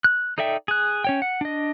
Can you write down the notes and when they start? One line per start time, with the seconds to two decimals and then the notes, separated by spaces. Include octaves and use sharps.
0.04 F#6
0.38 D#4 A4 D5 E5 G5
0.68 G#4 F#6
1.04 C#4 C#5 G5
1.22 F#5
1.41 D4 D#5